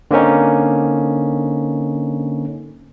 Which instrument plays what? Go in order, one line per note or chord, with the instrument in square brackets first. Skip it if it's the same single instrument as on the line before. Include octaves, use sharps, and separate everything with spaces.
[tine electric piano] D3 A#3 C4 C#4 D#4